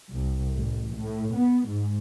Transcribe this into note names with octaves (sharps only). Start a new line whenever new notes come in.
C2
A1
A2
B3
G#2